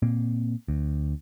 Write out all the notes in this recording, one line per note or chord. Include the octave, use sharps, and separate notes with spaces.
A#2 A#3 C4
D2